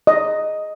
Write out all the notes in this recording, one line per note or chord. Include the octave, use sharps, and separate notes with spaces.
D#5